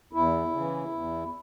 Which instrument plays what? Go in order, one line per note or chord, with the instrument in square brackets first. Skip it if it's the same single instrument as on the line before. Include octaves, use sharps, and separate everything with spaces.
[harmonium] E2 E4
C#3
E3
E2